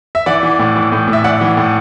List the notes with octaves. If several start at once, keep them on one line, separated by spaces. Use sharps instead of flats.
E5
E3 D5 F#5
E3
A2
E3
A2
A2
E5
E3 D5 F#5
E3
A2